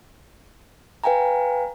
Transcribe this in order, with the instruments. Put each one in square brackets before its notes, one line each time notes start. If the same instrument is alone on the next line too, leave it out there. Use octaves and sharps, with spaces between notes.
[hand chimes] B4 F5 G5 G#5 A#5